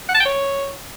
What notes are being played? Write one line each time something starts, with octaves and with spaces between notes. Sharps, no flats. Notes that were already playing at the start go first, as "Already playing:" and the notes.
F#5
A5
G5
C#5